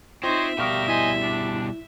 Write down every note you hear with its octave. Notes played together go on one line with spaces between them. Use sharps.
C4 D#4 F4 C5 C#5 D#5 E5
B2 G3 G4 A#4 F5 C#6 D#6
E4 C5 D#5 G#5 B6
D4